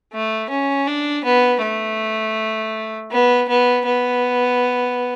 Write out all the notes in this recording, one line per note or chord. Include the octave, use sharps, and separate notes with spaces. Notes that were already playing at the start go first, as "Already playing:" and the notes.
A3
C#4
D4
B3
A3
B3
B3
B3